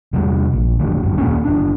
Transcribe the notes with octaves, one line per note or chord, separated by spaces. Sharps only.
E2 C3 G3
A#1
F1 D2 A2 D3
F#1 G2
D#2 A#2 A#3 C#4
F#1 D4